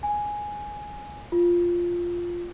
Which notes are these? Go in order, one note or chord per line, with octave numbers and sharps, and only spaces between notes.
G#5
F4